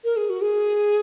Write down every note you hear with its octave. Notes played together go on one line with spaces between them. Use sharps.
A#4
G#4
F#4
G#4